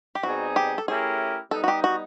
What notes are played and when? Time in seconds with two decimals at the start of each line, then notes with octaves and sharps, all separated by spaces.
0.15 G4
0.23 B2 G3 C4 D#4 F#4 G#4
0.56 G4
0.78 A4
0.88 A3 C#4 E4 G4 G#4 A#4
1.51 G3 B3 D#4 A4
1.64 F#4
1.68 G4
1.84 F#4